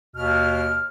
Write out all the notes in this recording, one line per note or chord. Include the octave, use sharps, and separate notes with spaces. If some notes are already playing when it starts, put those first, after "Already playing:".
D#2 B2 F6